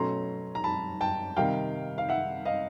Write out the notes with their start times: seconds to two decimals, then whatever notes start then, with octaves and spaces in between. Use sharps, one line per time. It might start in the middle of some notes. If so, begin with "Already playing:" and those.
Already playing: B2 F#3 A3 C#4 A#5 C6
0.55 A#5
0.64 A5 B5
1.01 G5 A5
1.37 C3 D#3 G3 F5 G5
1.98 F5
2.09 E5 F#5
2.45 D#5 F5